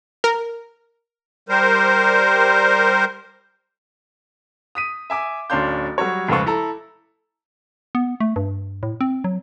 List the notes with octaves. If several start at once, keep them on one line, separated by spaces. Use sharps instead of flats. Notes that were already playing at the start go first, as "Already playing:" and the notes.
A#4
G3 A#4 C5
D#6 B6 D#7
E5 G#5 D6
D1 C#4 D4 F5 C6 G6
F#3 G3 F#4 C#5
F1 C#2 F3 B4 C#6
E4 A4 A#5
B3
A3
G2
A2
C4
F#3